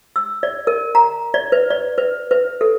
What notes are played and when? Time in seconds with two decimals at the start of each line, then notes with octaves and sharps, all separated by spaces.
0.16 E6
0.43 D5
0.67 A#4
0.95 A#5
1.34 D5
1.52 B4
1.70 D5
1.98 B4
2.31 B4
2.61 A4